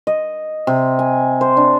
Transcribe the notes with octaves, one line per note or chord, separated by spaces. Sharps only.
D#5
C3
G#5
C5
D4